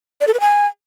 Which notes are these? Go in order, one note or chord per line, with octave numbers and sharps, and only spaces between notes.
D5
A4
B4
G#5